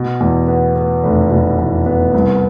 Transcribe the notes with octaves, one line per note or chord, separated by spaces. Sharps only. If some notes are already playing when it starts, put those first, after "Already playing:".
Already playing: B2
E2
B3
B3
F1
B2
E2
B3
C2